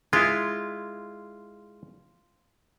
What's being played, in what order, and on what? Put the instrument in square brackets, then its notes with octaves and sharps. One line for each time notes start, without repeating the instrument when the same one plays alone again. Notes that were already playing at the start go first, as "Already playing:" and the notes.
[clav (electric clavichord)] G#3 E4 [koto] F4